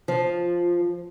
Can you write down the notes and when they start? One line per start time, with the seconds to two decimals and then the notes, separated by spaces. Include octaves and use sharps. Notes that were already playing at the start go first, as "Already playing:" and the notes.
0.08 F3